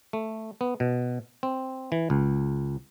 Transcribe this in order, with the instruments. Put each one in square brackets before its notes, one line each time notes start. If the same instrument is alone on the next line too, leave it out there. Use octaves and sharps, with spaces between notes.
[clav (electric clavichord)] A3
B3
B2
C4
E3
C#2